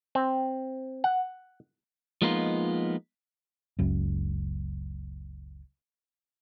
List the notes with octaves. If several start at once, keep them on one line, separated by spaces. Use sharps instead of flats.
C4
F#5
F3 G#3 A#3 B3 D#4 F4
F#1 C#2 F#2